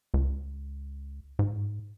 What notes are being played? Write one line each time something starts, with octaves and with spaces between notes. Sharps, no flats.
C#2
G#2